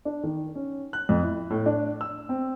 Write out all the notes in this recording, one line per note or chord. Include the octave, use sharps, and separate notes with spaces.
D4
D#3
C#4
F#6
F2
E4
A2
D4
E6
C4